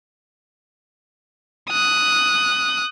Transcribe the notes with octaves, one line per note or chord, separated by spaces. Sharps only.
D#6 F#6